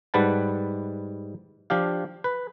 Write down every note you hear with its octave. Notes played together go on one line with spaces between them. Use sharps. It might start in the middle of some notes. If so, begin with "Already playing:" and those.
G#2 G3 B4 F#5 A5
F3 D4 G4 F5
B4